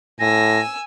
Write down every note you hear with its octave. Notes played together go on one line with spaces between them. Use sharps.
A2 G#5 E6 A#6